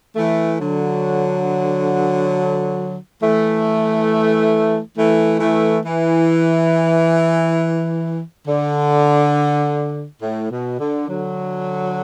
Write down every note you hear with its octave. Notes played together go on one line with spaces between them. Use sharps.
E3 A3
D3 F#3
E3 A3
E3 A3
E3 A3
E3
D3
A2
B2
D3
D3 F#3